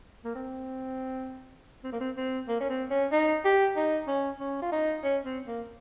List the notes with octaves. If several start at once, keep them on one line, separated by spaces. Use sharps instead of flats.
A#3
C4
C4
A#3
C4
C4
A#3
C#4
C4
C#4
D#4
G4
D#4
C#4
C#4
F4
D#4
C#4
C4
A#3